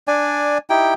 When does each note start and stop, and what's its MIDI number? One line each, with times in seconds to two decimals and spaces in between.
0.08 0.58 62
0.08 0.58 74
0.08 0.58 80
0.70 0.94 63
0.70 0.94 64
0.70 0.94 67
0.70 0.94 79